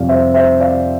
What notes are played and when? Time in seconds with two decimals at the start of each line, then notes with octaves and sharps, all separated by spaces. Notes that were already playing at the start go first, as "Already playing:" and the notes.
Already playing: F2 C3 G3 D5 F5
0.09 C5 E5
0.34 C5 E5
0.60 D5 F5